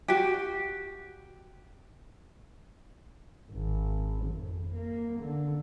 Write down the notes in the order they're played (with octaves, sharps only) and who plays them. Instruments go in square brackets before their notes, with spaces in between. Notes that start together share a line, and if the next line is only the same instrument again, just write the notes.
[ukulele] F#4 G4
[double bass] G#1
F2
A#3
D3